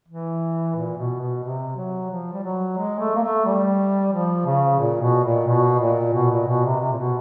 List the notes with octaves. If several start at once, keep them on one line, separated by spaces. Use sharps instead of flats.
E3
A#2
B2
B2
C3
F#3
F3
G3
F#3
G#3
A3
A#3
A3
G3
F3
C#3
A#2
B2
A#2
B2
A#2
B2
A#2
B2
C3
C3
A#2
B2